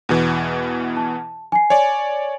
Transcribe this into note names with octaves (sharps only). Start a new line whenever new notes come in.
E2 B2 E3
A5
G#5 C7
C#5 D5 G#5